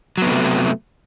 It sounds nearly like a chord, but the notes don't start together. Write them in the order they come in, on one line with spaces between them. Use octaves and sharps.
F#3 B3 C3 A3